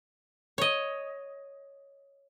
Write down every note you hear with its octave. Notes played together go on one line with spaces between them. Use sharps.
C#5 D#5